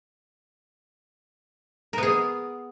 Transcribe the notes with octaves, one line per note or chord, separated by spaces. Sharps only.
B3 G#4 A#4